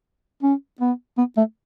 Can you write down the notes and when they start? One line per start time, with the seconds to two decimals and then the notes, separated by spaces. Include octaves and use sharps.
0.43 C#4
0.80 B3
1.18 B3
1.37 A3